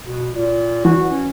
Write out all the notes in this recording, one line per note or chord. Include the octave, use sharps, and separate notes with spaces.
B2
A#2
E3 F#4
C#4